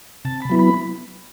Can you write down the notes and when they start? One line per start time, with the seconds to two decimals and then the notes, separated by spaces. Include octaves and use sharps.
0.25 C3 A5
0.42 B5
0.50 F#3 B3 E4
0.59 B5